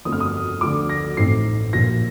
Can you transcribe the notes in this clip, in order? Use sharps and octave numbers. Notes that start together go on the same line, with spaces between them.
G1 F2 D3 A3 D#6
F6
D#6
D2 D3 F3 A3 D6
A#6
A1 A2 A3 C4 D#4 C7
A#1 A#2 F3 A#6